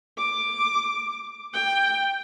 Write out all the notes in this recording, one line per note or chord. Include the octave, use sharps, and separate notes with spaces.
D6
G5